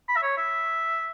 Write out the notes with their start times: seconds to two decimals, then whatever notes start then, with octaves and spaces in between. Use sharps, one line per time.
0.09 B5
0.16 E5
0.23 C#5
0.37 E5